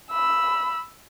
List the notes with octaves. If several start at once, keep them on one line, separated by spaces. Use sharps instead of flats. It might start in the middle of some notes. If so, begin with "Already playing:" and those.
B5 E6